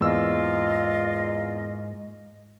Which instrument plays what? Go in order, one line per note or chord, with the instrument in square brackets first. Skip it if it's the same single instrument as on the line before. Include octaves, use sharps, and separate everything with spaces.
[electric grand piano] E2 E6 [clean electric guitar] G#2 A#3 [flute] F4 [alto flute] D#5